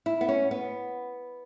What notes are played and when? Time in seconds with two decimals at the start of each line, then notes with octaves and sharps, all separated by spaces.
0.06 E4
0.21 B3
0.29 C#4
0.51 B3